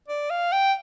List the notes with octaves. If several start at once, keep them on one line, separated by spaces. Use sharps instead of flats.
D5
F5
G5